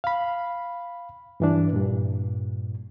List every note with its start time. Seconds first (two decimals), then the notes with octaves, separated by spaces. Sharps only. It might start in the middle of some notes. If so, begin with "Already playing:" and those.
0.04 F5 B5
1.40 G2 E3 D4
1.73 G2 A#2